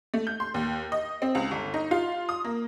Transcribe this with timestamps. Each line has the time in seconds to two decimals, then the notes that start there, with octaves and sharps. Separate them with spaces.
0.14 A3
0.27 G6
0.40 C6
0.54 D#2
0.92 D#5
1.22 C4
1.35 C#2
1.51 G1
1.74 D#4
1.91 F4
2.29 D#6
2.44 A#3